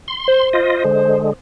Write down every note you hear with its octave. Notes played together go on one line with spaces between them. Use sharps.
C6
C5
F4 D#5
D3 G#3